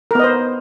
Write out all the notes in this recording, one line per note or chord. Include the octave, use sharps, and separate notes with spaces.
B3 A#4 C5 D#5